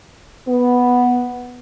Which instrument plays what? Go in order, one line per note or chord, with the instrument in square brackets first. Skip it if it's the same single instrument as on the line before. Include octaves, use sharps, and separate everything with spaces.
[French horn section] B3